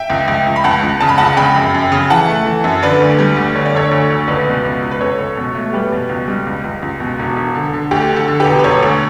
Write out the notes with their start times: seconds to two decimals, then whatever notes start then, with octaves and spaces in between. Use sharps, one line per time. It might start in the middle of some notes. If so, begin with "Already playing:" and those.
Already playing: E5 G5
0.10 C#2
0.28 C#2
0.47 C#2
0.56 B5
0.64 C#2 F#5 A5
0.83 C#2
1.01 C#3 A5
1.09 B5
1.18 C#2 F#5 A5
1.37 C#3 G5 B5
1.55 F#2
1.74 F#2
1.92 C#3
2.10 E3 F#5 A5
2.29 A3
2.46 E3
2.64 F#2
2.82 D3 B4 D5
3.00 D2
3.19 G3
3.37 D2
3.55 D3 C#5
3.66 D5
3.74 D2 A4 C#5
3.91 D2
4.10 D2
4.28 C#2 B4 D5
4.47 B2
4.65 C#2
4.82 C#2
4.91 B4
5.00 C#2 A4 C#5
5.19 C#2
5.37 B2
5.55 A3
5.73 G3 G4 B4
5.92 B2
6.09 C#2
6.28 G3
6.47 C#2
6.64 C#2
6.82 C#2
7.00 B2
7.19 E1
7.36 E1
7.55 D3
7.73 D3
7.91 D2 G4
8.10 D3
8.16 A4
8.28 D3
8.40 G4 B4
8.45 E1
8.59 B4
8.64 E1 A4 C#5
8.83 D2